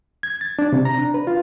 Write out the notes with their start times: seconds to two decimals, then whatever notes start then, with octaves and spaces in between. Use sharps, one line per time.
0.23 G#6
0.41 A6
0.59 D4
0.72 C3
0.85 A#5
0.98 D4
1.14 B4
1.27 F4